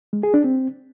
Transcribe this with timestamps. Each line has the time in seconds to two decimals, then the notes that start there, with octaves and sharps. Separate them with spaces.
0.13 G#3
0.23 G#4
0.34 D4
0.44 C4